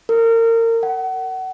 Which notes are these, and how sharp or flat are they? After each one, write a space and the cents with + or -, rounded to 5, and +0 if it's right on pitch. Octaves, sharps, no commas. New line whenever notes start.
A#4 -30
F#5 +30